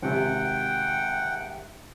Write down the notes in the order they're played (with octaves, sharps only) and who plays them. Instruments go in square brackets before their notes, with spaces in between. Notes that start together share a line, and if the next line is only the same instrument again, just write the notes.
[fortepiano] G#1 C3 [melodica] F#5 G5